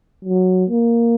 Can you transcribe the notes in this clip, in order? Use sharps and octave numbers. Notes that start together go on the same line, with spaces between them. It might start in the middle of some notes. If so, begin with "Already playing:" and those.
F#3
A#3